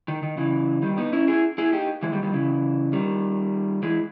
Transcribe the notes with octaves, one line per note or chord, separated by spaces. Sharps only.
D#3
D#3
C#3 E3
D#3 G3
B3 D#4
C#4 E4
E4 G#4
E4 G#4
D#4 G4
E3 G#3
D#3 G3
D#3 G3
C#3 E3
D#3 G3
E3 G#3